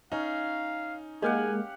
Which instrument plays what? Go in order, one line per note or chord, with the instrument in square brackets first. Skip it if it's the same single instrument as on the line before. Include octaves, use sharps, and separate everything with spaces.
[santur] C#4 [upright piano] D#4 [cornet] F5
[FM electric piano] G#3 A#3 [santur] G4 F5 F#5 [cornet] G#5